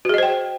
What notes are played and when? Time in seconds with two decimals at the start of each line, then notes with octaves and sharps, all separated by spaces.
0.05 F#4
0.09 G#4
0.14 D#5
0.18 C5
0.23 G5